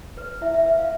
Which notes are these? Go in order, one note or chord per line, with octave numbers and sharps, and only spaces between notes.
B4
E4 E5
E5
B4 E5
F5